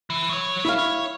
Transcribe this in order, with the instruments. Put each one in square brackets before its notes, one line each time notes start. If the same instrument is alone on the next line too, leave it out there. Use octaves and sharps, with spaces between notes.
[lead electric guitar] E3
F#3 C#5
[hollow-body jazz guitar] E4 F5
[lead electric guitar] C#5